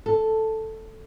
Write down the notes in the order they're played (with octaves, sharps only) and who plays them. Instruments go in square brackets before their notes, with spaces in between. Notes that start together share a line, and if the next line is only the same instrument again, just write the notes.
[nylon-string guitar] A4